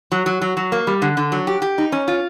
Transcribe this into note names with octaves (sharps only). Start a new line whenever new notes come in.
F#3
F#3
F#3
F#3
A#3
G3
D3
D3
F#3
G4
G4
D#4
C#4
F4